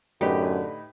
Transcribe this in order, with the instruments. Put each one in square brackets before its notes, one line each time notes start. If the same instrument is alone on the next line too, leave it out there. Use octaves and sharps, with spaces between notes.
[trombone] F#2 [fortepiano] A2 D#4 B4 [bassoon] D3 [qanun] G4